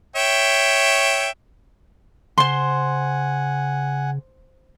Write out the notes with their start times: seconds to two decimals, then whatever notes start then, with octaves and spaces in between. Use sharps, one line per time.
0.16 C#5 E5 G5
2.38 C#3 C5 F#5 G#5 C6